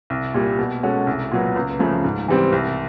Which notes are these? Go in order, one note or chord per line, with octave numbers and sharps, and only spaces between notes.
C2
A#2 G3
B2
G#3 C#4 F#4 A4
C2
A#2 F#3 B3
C#2
C#3 F3 A3
G#2
E3 G3 C4
C2